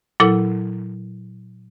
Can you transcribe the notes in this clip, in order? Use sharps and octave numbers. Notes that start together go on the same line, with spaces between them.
A#2 F#3 E4 A4